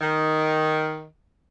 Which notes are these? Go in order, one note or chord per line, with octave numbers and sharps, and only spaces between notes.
D#3